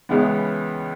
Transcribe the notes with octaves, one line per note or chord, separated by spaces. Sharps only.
C#2 C#3 E3 B3